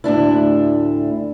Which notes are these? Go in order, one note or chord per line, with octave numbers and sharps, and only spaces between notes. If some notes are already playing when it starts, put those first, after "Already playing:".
D2 A2 D4 E4